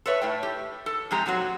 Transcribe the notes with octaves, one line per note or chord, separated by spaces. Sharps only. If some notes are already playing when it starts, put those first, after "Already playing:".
A4 B4 C#5 E5
A2 A3 G5
G4
A4
F2 C3 G#3 G4 A#5
A#2 F#3 C4 F#4